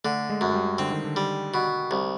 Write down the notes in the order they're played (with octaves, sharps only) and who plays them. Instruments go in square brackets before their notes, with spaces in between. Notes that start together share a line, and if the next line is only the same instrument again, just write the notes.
[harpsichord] D3 [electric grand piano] A3
[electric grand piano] G#3
[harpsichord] F#2
[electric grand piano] G3
[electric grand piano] D3 [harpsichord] C4
[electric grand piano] D#3
D3
[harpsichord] G3
B2
C2